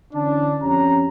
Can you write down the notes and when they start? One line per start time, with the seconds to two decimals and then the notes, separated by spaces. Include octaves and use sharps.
0.13 D3 E3 C#4 D4
0.62 F2 C#4 G4 A#5